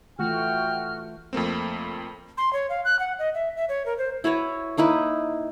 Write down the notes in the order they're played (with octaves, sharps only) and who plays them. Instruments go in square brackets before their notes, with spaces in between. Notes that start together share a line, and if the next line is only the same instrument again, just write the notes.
[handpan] E3 A3 F4 [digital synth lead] F#4 [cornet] G5 [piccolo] F6
[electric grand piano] F2 A3 A#3 C4
[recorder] C6
C#5
F5
F#6
F#5
D#5
E5
E5
C#5
A#4
C5
[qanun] E4 F#4 B4 C#5
A#3 D#4 E4 B4